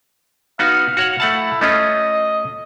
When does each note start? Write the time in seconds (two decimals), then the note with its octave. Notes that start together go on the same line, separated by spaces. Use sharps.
0.59 B3 D#4 F#4 F5
0.97 F#4 C#5 F#5
1.20 A3 E4 F#5 A5
1.61 A3 C#4 F4 D#5